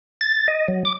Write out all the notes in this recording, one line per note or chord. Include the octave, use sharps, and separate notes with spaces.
A6
D#5
F#3
D6